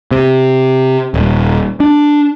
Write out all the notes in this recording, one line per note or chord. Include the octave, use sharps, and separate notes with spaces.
C3
D#1
D4